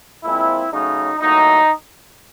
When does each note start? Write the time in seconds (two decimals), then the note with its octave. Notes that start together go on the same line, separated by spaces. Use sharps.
0.24 A#2 F3 G#3 C4 E4
0.72 C#3 F#3 A3 D#4
1.21 A2 F#3 A#3 D#4